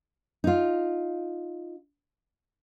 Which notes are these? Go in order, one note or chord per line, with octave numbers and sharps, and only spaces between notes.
D#4 F4